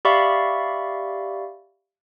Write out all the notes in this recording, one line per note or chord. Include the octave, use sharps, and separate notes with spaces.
G4 D5 E5 F5 B5 C#6